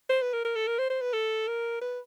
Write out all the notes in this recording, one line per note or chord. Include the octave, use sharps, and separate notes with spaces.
C5
B4
A#4
A#4
A4
A#4
C5
C5
B4
A4
A#4
B4